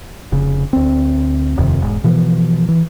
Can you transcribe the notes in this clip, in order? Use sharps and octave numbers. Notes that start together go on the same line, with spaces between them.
F1 C#3
D2 C4
D#1 F2 C3 D#3
E1 G#2
B2 E3 F3
E3